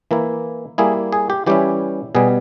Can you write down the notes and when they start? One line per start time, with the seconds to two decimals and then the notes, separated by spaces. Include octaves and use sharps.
0.11 E3 A#3 E4
0.78 G3 A#3 E4 G#4
1.13 G#4
1.30 G4
1.46 E3 G3 C#4 E4 G4
2.15 B2 G3 B3 G#4